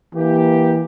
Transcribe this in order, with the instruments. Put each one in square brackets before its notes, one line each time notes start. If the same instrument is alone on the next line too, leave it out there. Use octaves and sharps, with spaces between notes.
[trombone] E3 [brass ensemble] A#3 G4